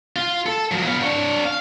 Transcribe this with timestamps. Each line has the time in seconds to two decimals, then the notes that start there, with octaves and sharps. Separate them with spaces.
0.16 F4 F5
0.46 A4
0.72 F3 F#3
0.85 B3 F5
1.02 D4 C#5
1.45 F5